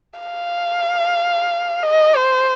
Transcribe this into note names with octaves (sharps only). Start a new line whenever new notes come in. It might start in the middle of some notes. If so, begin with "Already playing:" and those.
F5
D#5
C5